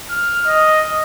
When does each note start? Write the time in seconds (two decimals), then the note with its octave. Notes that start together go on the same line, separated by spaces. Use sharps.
0.10 F6
0.46 D#5